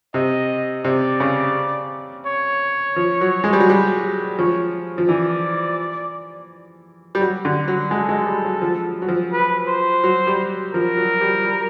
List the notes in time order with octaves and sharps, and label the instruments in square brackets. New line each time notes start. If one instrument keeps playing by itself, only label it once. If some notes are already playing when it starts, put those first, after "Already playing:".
[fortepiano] C3 [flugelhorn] D#5
[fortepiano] C3 [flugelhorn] D5
[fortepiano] C#3
[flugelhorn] C#5
[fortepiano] F3
F#3
G#3
G3
F#3
G3
[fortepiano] F3 [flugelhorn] C#5
[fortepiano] F3
[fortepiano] E3 [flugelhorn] D5
[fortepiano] G3
F#3
D3
F#3
[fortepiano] G#3 [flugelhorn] A4
[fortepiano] G#3
G3
F#3
F3
F#3
F3
[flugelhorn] B4
C5
[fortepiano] F#3
G3
[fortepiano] F3 [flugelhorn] A#4
[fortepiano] F#3
G3
G3